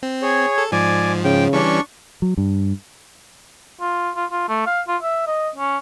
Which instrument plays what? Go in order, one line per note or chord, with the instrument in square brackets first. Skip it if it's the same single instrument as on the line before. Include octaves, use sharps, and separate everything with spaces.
[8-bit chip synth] C4
[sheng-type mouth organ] G#4 C#5
[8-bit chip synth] A4
[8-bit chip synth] G#2 F3 [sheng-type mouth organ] D5 G#5
[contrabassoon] C#3 [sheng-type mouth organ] G5
[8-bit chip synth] E3 G3 C#4 [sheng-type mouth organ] D4 C#6
[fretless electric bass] F#3
G2
[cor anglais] F4
F4
F4
A3
F5
F4
E5
D#5
C#4